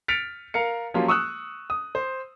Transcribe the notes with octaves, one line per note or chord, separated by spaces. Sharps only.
F6 A6 B6 C#7 D7 F7
A#4 F5 C#7
F3 F#3 A#3 C#4 F4 G4
C#6 D#6 E6 F#6
D#6
C5